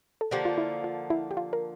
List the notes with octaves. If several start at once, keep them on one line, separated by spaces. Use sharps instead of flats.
A4
D3 F3 A#3 G4
F4
E4
F4
E4
G4
F4
A#4